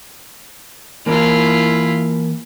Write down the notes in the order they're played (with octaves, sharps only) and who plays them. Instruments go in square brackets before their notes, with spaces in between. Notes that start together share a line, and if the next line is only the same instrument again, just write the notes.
[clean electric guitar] E3 A#3 [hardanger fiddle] E4 F4